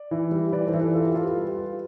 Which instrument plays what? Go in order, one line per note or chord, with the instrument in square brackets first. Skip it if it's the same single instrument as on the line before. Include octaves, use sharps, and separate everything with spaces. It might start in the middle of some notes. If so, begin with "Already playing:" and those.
Already playing: [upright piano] D5
E3
G3
E3 B4 D5
A4 C5
E3
A4
F4 A4
G4
F4 A4
G4 B4
G3
F4